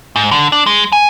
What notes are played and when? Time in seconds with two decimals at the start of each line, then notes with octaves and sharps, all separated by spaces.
0.16 G#2
0.31 D3
0.52 D4
0.66 G#3
0.92 G#5